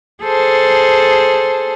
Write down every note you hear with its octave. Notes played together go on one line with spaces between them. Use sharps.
G#4 A4 C5